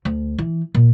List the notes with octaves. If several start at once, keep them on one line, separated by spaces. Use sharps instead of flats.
D2
E3
A#2